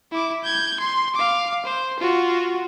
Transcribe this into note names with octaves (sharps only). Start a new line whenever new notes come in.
E4 D6
G6 G#6
C6
F5 D6
C5
F4 F#4